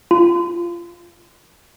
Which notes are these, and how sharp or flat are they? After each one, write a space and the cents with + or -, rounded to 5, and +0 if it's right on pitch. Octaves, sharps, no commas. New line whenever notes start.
F4 -20